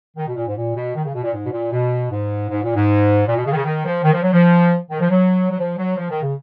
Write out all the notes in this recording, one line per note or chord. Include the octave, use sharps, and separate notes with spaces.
D#3
B2
A#2
G#2
A#2
B2
D#3
C#3
B2
A#2
G#2
B2
A#2
B2
G#2
G#2
A#2
G#2
A#2
B2
C#3
D#3
C#3
D#3
F3
D#3
F3
F#3
F3
D#3
F3
F#3
F#3
F3
F#3
F3
D#3
C#3